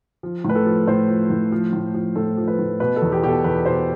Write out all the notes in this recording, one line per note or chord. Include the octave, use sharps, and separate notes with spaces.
F3
A2 B4
A4
F3
A2 C5
F3
A2
F3
A2
F3
A2 A4
F3
B4
A2
B2 B4
A4
E2
G4
B2 G4
A4
E2 B4
B2 C5